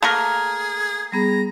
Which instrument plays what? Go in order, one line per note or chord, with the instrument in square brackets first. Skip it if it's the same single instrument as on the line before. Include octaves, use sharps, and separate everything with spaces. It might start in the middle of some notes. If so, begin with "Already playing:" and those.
[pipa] A3 A#3 A#4 [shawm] G#4
[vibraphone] G3 B3 G#4 [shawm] A#5